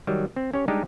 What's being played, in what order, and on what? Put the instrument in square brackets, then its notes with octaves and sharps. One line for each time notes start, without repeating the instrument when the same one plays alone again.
[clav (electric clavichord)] D#3 F#3 G3
C4
C#4 G4 C#5
G3 G#3 D4 D#4 G4